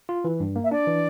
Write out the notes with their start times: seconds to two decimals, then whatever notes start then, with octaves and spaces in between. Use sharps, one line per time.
0.09 F4
0.24 E3
0.40 G2
0.56 A#3
0.64 E5
0.71 D4 D5
0.87 E3